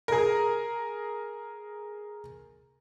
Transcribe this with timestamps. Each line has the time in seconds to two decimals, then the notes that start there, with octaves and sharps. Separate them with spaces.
0.08 G#4 A#4